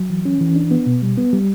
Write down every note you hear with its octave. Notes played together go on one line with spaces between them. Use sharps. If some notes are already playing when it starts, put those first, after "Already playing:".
Already playing: F#3
E3
C#4
E3
D4
B3
B2
G3
B3
G3